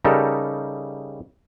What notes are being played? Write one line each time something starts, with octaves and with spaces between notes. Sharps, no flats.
C#3 G3 D#4 G4 A4 A#4